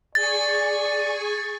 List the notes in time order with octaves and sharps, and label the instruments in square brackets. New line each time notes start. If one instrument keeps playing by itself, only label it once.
[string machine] G#4 G#5 C#6 [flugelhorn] D5 [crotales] A6